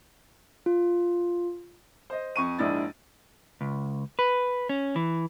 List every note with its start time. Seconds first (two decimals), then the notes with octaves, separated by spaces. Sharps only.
0.66 F4
2.10 C5 D#5
2.36 F2 C#6 D#7
2.59 A#1 G#2 D4 E4 A6
3.61 C#2
4.19 B4
4.69 C#4
4.96 E3